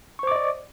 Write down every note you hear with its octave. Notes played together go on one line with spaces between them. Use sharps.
C5 D5 D#5 C#6 D6